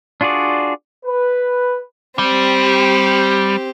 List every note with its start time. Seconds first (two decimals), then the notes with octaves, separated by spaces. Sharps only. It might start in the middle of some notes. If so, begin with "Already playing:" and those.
0.21 D4 F4 F#4 G#4 D5
1.06 B4
2.19 G3 C4 G4